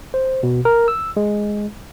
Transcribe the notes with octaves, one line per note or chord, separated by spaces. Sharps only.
C5
B2
A#4
E6
G#3